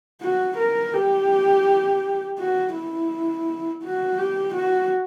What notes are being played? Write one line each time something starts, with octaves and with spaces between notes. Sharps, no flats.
F#4
A#4
G4
F#4
E4
F#4
G4
F#4